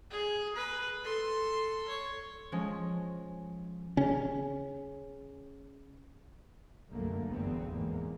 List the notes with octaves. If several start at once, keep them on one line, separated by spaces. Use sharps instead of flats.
G#4
B4
A4 C6
C#5
F3 G#3 C#4
C#3 C#4
C2 F#2 D3 A3 A#3
G1 E2 B2 B3 C4
E2 G#2 A#3